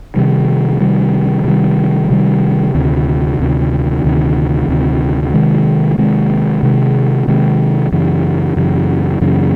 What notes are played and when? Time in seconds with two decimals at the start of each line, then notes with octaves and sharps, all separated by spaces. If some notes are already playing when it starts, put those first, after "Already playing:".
0.16 C3 D#3 G3
0.80 C3 D#3 G3
1.45 C3 D#3 G3
2.10 C3 D#3 G3
2.75 D2 C3 D#3
3.39 D2 C3 D#3
4.04 D2 C3 D#3
4.68 D2 C3 D#3
5.34 C3 D#3 G#3
5.98 C3 D#3 G#3
6.63 C3 D#3 G#3
7.27 C3 D#3 G#3
7.92 F#2 C#3 E3
8.56 F#2 C#3 E3
9.21 F#2 C#3 E3